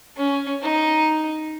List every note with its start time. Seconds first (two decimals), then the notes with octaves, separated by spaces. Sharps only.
0.17 C#4
0.62 D#4